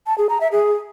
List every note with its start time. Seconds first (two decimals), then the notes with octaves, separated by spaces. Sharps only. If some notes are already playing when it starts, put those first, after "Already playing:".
0.07 A5
0.18 G#4
0.29 A#5
0.41 E5
0.52 G#4